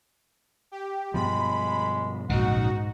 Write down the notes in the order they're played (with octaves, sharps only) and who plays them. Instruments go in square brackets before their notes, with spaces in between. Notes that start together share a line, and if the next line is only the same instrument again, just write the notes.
[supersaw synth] G4
[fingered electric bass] G2 B2 F3 [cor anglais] G#3 [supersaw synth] B5
[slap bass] A#1 E2 C#3 [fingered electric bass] G#2 [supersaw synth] D#4 F#4 [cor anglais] F#5